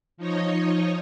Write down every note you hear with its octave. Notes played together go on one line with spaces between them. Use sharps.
F3 D#4 C#5 D#5